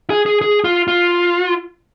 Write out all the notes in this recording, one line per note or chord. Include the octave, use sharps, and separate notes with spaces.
G#4
G#4
G#4
F4
F4